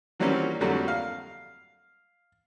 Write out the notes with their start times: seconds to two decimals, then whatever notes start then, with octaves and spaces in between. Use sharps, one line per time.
0.20 E3 F#3 G3 A#3 C4 C#4
0.61 F2 D3 F#3 G3 A3 A#3
0.88 F5